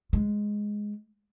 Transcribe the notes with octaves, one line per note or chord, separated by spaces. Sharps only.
G#3